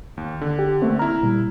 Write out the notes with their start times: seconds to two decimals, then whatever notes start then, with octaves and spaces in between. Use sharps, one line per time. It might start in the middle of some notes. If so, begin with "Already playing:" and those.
0.17 D#2
0.41 D3
0.59 G4
0.82 A3 A#3 C4
0.99 E4 A#5 F6
1.23 A#2 G3